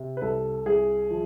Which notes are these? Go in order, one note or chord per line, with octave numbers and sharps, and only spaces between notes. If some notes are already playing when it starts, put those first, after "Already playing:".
Already playing: C3
B4
C2 A4
C2 G#4
F3